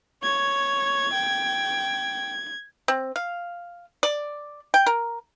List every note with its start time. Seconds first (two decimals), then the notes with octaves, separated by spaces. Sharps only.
0.23 C#5 G#6
1.14 G5
2.88 C4
3.16 F5
4.03 D5
4.74 G5
4.86 A#4